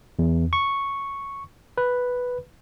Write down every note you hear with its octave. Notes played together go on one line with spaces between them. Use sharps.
E2
C#6
B4